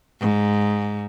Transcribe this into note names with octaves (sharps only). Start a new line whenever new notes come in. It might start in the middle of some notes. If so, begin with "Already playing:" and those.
G#2